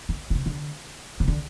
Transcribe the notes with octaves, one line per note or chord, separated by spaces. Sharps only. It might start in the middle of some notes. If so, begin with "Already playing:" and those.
D3
B2
C3
D3
C3
D3